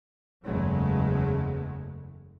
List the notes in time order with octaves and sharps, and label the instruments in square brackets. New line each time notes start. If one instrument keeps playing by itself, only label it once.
[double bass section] F#1 E2 C#3 F#3 G#3 A3